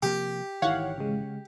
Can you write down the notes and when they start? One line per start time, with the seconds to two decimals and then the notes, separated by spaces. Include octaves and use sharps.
0.03 C3 F3 A#3 G4
0.62 G#1 D#3 E3 E4 C#5 F5 F#5
0.98 C#3 G#3